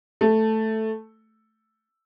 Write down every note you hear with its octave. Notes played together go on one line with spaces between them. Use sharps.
A3